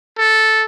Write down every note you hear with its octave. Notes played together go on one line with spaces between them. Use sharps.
A4